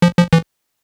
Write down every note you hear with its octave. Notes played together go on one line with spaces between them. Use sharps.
F3
F3
E3